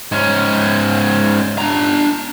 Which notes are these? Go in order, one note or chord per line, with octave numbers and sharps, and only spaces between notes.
G#2 C#4
D4 A#5